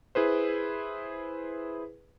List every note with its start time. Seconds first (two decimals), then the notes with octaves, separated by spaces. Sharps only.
0.15 E4 G#4 B4 C5